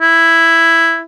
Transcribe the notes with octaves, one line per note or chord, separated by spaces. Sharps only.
E4